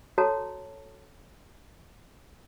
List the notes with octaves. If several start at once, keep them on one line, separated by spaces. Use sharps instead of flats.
F#4 A4 C#5 A5 A#5